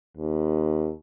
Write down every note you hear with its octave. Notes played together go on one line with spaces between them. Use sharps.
D#2